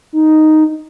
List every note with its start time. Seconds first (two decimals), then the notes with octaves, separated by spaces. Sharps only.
0.13 D#4